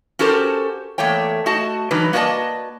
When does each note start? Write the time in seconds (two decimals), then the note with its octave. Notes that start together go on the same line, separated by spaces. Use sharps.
0.19 C#4 F#4 G4 A4 A#4 C5
0.98 E2 A3 A#3 C#5 G5
1.46 A3 F#4 D#5 A5
1.91 E3 F#3 G3 D4 D#4 B4
2.13 A#3 F#4 B4 D5 D#5 A5